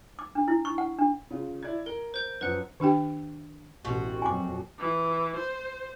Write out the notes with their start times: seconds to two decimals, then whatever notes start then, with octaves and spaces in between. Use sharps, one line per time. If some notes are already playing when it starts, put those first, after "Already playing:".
0.19 D6
0.35 D4
0.48 E4
0.65 C#6
0.78 F#5
0.99 D4
1.31 C#3 F4
1.63 E4 D5 G#6
1.86 A#4 G7
2.14 C5 G6
2.41 F#2 F3 B4 F#5
2.80 D#3 D4 G4 G5
3.85 A1 B2 C4 F#4
4.22 F2 A#2 F#3 G#5 D6
4.79 E3
5.35 C5